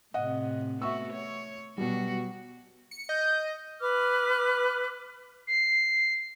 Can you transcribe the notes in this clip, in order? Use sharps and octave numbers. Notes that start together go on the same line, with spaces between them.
A2 C3 D#5 F#5
A3 B3 F#4 E5 C#6 E6
C#5
B2 F#3 G3 F#4
C#7
D#5 G6
B4 D6 F6
C7